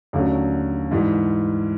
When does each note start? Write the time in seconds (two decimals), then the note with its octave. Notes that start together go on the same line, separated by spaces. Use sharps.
0.13 D#2 D3 F#3 A3 C#4
0.91 G#2 E3 G3